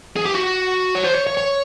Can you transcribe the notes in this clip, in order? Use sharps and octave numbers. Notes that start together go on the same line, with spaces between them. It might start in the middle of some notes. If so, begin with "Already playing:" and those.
G#4
G4
F#4
C#5
C5
C#5
C#5
C#5